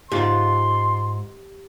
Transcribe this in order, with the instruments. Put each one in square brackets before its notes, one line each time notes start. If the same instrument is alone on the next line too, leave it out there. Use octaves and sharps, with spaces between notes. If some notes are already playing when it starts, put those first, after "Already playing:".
[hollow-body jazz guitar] G#2 F4 [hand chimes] G4 [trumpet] C6